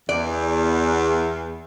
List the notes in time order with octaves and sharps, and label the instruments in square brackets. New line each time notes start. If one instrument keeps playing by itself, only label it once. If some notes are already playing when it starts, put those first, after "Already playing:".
[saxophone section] E2 [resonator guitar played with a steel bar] D5